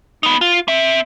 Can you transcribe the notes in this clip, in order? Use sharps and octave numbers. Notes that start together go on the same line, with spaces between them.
B3 D#4
F4
C4 E5